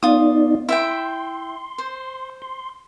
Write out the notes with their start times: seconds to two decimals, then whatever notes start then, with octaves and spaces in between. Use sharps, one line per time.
0.03 B3 D#4 F4 D5 D#6
0.69 E4 E5 G5 C6
1.78 C5
2.42 C6